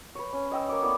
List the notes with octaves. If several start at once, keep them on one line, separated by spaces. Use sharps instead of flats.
B4 C#5
C#4
D#5 G5 E6
A#3 C#5 D6
A3 B3 E4 D5